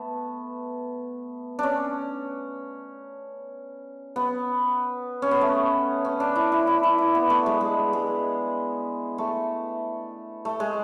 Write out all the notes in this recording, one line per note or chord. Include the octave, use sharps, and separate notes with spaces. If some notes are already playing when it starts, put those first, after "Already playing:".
Already playing: A3 B3
C#4 D4
B3
C#4
B3
A3
C#4
D4
E4
E4
E4
E4
E4
B3
A3
G#3
G#3
G#3
A3
A3
G#3